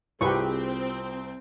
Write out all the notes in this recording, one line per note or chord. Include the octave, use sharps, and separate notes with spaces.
C2 C4 F4 G4 G#4 B4 C#6